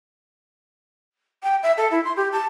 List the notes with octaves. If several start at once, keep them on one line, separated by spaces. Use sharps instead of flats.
G5
E5
A4
E4
C6
G4
A5